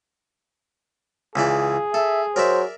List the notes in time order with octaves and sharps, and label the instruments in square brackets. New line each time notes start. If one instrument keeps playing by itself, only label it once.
[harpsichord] C#2 E3 D5 [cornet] G#4
[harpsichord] A4 [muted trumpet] E5
[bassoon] F#3 [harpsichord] A#4 D5 E5 [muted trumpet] C5